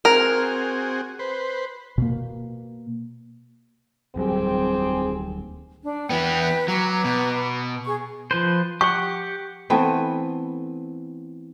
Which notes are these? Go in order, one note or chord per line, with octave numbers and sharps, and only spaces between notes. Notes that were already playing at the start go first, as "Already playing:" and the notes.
C4 F#4 G#4 A#4
B4 C5
B2 A#3
D1 F#3 G3 C4 G4 G#4
D4
E3 B3 B4 G5 B5
F#3 B4 A#5 D6
B2
G#4 C#6
F3 B4 C5
G4 F#5 C#6
E3 A3 B3 C4